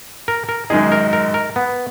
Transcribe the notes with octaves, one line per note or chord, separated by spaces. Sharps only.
A#4
A#4
F#2 D#3 G#3 D#4 G#4
A#4
A#4
A#4
B3